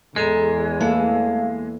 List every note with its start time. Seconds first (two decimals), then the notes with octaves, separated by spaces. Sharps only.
0.16 E2 G#3 A4 G#5 A#5
0.81 A3 A#3 E4 A4 F5